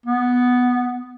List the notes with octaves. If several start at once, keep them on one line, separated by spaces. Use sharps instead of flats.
B3